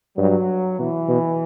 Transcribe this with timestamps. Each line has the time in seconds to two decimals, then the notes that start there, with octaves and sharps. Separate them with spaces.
0.18 G2 F#3
0.78 B2 E3
1.08 B2